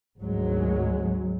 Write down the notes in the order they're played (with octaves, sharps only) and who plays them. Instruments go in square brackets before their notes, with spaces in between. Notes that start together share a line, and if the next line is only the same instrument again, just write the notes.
[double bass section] G#1 D2 F#3 G#3